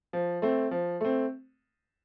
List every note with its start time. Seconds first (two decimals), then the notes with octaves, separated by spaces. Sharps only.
0.13 F3
0.42 A3 C4
0.71 F3
1.01 A3 C4